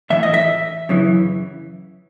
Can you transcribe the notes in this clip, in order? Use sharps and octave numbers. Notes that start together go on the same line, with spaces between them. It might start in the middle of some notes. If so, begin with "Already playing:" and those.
A2 E3 E5
D#5
E5
F#2 C#3 E3